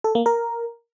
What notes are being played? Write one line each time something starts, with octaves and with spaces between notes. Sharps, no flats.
A4
A#3
A#4